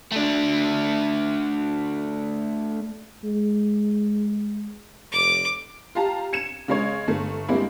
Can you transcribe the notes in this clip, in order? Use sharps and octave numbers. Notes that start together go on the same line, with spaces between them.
A3 D4
G#3
F1 D6
F4 G4 F5 A5 A#5
G#6 C#7 D#7 E7
C#3 G#3 C#5
G1 A3
G3 G#3 A#3 C4 D4 E4